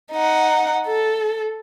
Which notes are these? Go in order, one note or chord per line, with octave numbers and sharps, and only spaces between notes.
D#4 F#5
A4